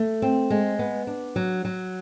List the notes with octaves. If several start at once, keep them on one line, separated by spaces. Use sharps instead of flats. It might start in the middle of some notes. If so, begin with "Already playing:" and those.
Already playing: A3
C4
G#3
B3
D4
F#3
F#3